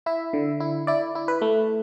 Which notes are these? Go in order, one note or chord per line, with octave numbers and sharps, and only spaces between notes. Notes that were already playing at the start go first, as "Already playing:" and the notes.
E4 E5
D3
E4
E4 D5
E4
B4
A3